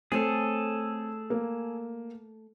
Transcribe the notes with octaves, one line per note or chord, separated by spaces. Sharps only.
A3 C4 G#4 A4 C#5
A#3